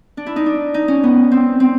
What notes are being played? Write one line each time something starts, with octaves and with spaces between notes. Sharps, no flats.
D4
E4
D#4
D4
D#4
C#4
B3
C4
C4